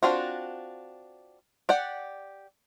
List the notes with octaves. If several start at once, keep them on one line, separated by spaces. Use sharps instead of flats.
C4 D4 F4 F#4
G4 D5 F#5